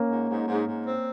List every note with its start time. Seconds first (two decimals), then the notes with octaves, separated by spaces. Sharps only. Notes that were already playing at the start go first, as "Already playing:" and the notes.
Already playing: A#3 C#4
0.10 G#2
0.29 G#2
0.48 G#2
0.67 G#2
0.86 C4